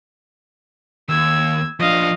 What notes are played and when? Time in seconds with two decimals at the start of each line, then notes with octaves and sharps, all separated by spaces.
1.09 D#2 E6 G#6
1.80 F3 D4 D#5 F5